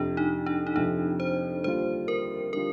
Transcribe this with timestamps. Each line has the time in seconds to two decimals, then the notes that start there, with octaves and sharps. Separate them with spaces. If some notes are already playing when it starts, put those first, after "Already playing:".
Already playing: F2 C3 F3 D4
0.17 D#4
0.46 D4
0.67 D#4
0.76 F2 C3 F3 D4
1.20 C5
1.64 D#2 D3 G3 D4 F4 C5
2.08 A#4
2.53 D3 G3 D4 F4 A#4